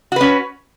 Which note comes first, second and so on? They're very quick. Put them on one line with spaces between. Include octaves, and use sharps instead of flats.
F#4 B4 C#4